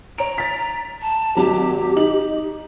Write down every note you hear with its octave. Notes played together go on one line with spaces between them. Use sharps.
C#5 A#5 D7
A6 B6
A5
G#1 F#3 G4
D#4 F#7